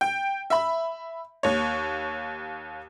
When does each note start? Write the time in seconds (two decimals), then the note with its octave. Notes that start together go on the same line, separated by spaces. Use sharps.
0.01 G5
0.50 E5 B5
1.43 D#2 C#5